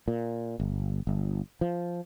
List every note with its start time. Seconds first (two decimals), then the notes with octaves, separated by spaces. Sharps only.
0.08 A#2
0.60 G1
1.07 G1
1.61 F3